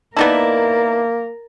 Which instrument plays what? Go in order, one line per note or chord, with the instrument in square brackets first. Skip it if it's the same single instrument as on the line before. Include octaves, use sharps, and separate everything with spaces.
[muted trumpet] A#3 [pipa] B3 D#4 E4 [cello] A#4 [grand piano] D5 A5